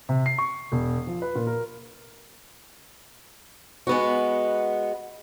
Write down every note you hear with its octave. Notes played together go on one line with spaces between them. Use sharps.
C3
C7
C#6
E1
F3
B4
A#2
A#4
G#3 B3 F#4